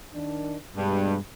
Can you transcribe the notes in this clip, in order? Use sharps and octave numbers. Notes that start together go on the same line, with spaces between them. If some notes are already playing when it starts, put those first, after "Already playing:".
D#3 D4
G2 B2 G3 G#3